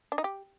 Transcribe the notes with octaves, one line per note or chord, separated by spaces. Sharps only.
D4
D#4
G4